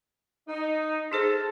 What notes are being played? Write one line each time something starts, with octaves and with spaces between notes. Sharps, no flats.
D#4
D#4 G#4 A4 C5